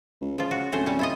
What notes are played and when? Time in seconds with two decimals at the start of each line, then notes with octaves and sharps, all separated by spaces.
0.21 C#2
0.38 C#3 F3 F4
0.51 F#4
0.72 D1 A3 C#4 C5
0.86 G3 C#4
0.99 E4 F4 D#5